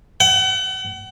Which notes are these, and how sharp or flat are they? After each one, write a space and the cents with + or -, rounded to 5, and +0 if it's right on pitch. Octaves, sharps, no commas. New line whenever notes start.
F#5 +40